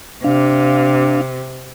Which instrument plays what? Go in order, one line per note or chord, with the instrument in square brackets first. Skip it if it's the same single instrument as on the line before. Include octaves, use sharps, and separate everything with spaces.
[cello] C3 [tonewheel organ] D4 F5